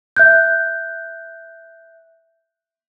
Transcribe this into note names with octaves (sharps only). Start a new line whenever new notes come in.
E5 F#6 G6